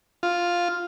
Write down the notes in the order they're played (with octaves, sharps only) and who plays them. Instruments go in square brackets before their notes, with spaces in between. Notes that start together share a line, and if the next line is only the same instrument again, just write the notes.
[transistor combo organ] F4